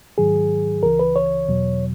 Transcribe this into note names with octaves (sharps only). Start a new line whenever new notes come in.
G#2 D#3 F#3 G#4
C#2 C#3 E3 A#4
B4
C#5
E2 B2 F#3